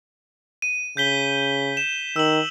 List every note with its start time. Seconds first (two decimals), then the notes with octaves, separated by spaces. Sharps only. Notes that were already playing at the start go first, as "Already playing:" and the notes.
0.62 D#7
0.97 C#3 G6 B6 G7
1.77 E7
2.16 D#3 E6 F#7